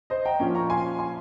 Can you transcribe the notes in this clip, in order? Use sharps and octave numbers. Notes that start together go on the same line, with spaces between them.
C5 D#5
G5 A#5
A#2 F3 A#3 C#4
A#5 C#6
G#5 C6
G#5 C6